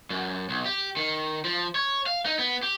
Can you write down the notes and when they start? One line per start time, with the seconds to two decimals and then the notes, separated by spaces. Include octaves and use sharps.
0.10 F#2
0.49 B1
0.66 G4
0.97 D#3
1.44 F3
1.75 C#5
2.06 F5
2.26 D#4
2.39 B3
2.63 G4